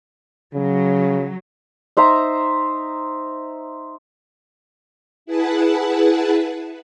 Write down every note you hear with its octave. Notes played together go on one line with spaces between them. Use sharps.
C#3 F#3
D#4 C5 E5 A#5
E4 G#4 B4 F#5 A5